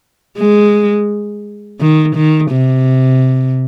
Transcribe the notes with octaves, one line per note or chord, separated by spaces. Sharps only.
G#3
D#3
D#3
C3